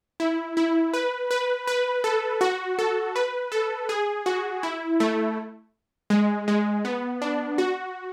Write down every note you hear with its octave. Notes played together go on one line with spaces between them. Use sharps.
E4
E4
B4
B4
B4
A4
F#4
A4
B4
A4
G#4
F#4
E4
A3
G#3
G#3
B3
D4
F#4